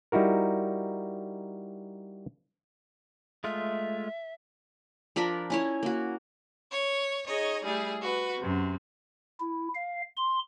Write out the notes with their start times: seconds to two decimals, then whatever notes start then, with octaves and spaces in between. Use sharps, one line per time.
0.12 G3 D#4 E4 F#4 A#4
3.44 G#3 A3 F4 E5
5.16 F3 D4 A#4 B5
5.50 C#4 E4 C#5
5.83 A#3 F#4
6.71 C#5
7.25 D#4 G#4 C#5 D#5
7.64 G3 A3 E4 G#4
8.02 F#4 B4
8.38 F#2 C3
9.40 E4
9.75 F5
10.16 C6